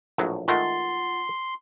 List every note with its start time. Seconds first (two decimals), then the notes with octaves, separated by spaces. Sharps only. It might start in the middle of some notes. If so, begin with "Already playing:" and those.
0.18 A#1 A2 F#3
0.48 D#3 G#3 A3 F4 F#5 C6 A6